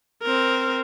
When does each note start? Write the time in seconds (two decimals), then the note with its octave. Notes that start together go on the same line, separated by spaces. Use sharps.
0.22 C4 A#4